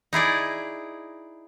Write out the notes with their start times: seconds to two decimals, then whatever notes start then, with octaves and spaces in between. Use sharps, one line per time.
0.13 D#4 E4 G#4 D5